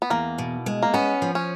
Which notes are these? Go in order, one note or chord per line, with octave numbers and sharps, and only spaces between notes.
B3
E2 A#3
B2
G#3
A#3
B3 C#4
F3
C#4